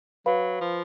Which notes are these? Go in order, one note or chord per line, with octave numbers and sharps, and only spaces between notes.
F#3 B4 F5 B5
F3